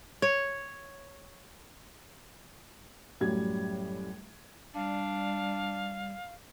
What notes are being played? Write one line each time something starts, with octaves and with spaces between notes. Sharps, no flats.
C#5
F#2 A2 G3 G#6
G3 D4 F5